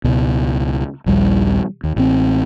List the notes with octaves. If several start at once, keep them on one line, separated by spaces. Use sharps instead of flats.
C#2 B2
A#1 D#2 G3
D#2
A1 C4